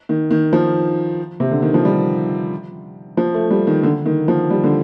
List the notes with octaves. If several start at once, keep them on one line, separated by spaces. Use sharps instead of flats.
D#3
D#3
F3
C3
D3
D#3
F3
G3
F3
A3
G3
D#3
D3
D#3
F3
G3
D3